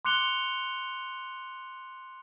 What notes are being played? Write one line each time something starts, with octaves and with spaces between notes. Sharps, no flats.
C6 D6 F#6 C#7 F7 G7